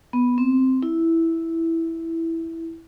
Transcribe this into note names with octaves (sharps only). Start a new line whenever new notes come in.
B3
C4
E4